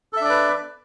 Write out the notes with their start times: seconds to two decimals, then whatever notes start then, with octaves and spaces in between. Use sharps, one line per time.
0.13 A4
0.17 E5
0.21 D4
0.25 D5
0.29 B4